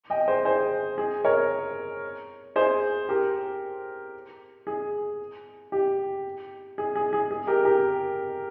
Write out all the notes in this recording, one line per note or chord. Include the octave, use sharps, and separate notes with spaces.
D#5 G5
G#4 C5
G#4 C5
G#4
A#4 C#5
G#4 C5
G4 A#4
G#4
G4
G#4
G#4
G#4
G#4
G4 A#4
G4 A#4